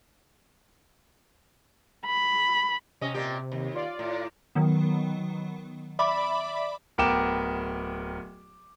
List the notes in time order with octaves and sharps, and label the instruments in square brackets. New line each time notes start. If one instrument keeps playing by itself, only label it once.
[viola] B5
[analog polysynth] C3 [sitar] C#4 D#5
[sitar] A#2 G4
D#2
[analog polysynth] F4 D5
[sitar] A2
[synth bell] D#3 F#3 B3
D5 E5 B5 D6
[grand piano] D1 B3 A#4 G5 D6 E7